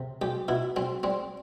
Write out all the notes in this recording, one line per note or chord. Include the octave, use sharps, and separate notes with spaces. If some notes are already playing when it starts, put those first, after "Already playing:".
Already playing: C3
B1 G4
B2 E4
B1 C4
G3 C4